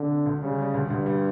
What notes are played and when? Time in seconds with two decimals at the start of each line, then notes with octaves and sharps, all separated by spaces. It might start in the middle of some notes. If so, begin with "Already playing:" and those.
Already playing: D3
0.10 C3
0.26 D2
0.42 C#3 G3
0.59 G3
0.74 D2
0.90 D2 G2
1.06 G3